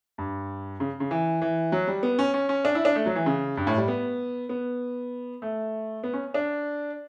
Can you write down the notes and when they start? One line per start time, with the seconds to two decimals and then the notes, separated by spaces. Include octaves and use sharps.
0.18 G2
0.80 C#3
1.00 C#3
1.11 E3
1.42 E3
1.72 F#3
1.88 G3
2.03 B3
2.19 C#4
2.34 C#4
2.49 C#4
2.65 D4
2.75 E4
2.85 D4
2.96 A3
3.06 F#3
3.16 E3
3.26 C#3
3.57 G2
3.67 A2
3.77 G3
3.88 B3
4.49 B3
5.42 A3
6.03 B3
6.13 C#4
6.34 D4